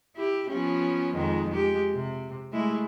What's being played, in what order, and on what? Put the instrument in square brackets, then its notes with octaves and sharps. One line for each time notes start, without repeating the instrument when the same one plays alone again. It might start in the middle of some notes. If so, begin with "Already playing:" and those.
[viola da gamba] E4 G4
F3 B3 C#4
F2 D#3 G#3
G#3 G4
C3
G#3 A3 E4